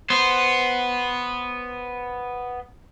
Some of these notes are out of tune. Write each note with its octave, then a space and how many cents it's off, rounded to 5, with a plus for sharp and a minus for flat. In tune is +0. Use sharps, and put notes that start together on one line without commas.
B3 +0 C5 +0